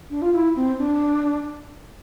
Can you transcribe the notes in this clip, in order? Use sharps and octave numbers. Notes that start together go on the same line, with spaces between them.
D4
F4
E4
C4
D4